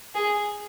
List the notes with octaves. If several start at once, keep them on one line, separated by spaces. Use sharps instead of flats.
G#4